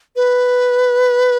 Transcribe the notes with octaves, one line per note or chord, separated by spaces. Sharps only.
B4